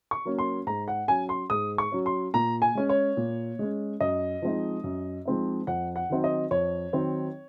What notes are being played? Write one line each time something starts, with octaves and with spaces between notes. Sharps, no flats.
C#6
F#3 A#3 C#4
C6
G#2 A#5
F#5
F#3 C#4 G#5
C6
G#2 D#6
C#6
F#3 C#4
C6
A#2 A#5
G#5
G#3 C#4
C#5
A#2
G#3 C#4
F#2 D#5
F3 G#3 C4 D#4
F#2
F3 G#3 C4 D#4
F2 F#5
F#5
D#3 F#3 C4 D#4
D#5
F2 C#5
D#3 F#3 C4 D#4